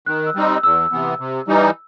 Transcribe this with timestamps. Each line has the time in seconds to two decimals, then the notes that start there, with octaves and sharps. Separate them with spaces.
0.06 D#3 F#6
0.26 E6
0.35 G3 C4 D#4
0.45 E6
0.63 E2 E6
0.92 C3 E3 B3
1.20 C3
1.48 E3 G3 D#4